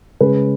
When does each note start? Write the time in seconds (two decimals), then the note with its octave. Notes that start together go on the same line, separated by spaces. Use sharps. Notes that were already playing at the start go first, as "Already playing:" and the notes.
0.20 C#3 G#3 C#4 B4